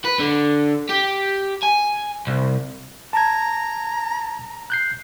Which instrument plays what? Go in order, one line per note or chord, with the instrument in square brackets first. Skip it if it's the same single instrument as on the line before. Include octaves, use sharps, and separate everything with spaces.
[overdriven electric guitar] B4
D3
G4
G#5
C2
[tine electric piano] A5 G#6 [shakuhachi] A#5
[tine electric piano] F#6 G6 C7